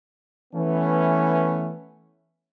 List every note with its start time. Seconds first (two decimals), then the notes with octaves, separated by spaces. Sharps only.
0.54 E3 A3 B3 C#4